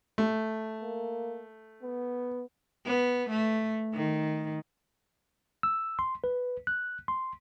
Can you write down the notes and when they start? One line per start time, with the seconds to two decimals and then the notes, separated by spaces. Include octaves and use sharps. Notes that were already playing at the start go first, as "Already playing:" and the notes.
0.18 A3
0.81 A#3
1.83 B3
2.86 B3
3.30 A3
3.94 D#3
5.63 E6
5.99 C6
6.24 B4
6.67 F#6
7.08 C6